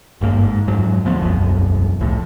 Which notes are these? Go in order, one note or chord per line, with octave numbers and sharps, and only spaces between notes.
G#1 G2 A#3
G#2
F2 G#2 F#3
D2 F3 B3
E1 C2 F#2 B3
C2 F2 A2